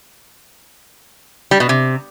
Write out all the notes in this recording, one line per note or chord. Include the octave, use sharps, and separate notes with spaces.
G3
B2
C3